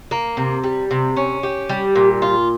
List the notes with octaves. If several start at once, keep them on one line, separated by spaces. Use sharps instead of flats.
A#3
C3
G3
C3
C#4
G4
G3
A#2
F4